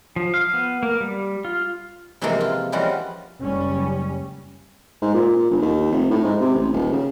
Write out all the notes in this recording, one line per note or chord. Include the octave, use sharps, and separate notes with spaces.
F3
F5
B3
A#3
G3
F4
C3 E3 F3 G#3 A#3 A4
F4
E3 F3 G3 G#3 C#4 F#4
F#1 G3 C#4
G#2
A#2
A#2
G1
D#2
F1
A2
G#2
C3
A1
D#1
C#3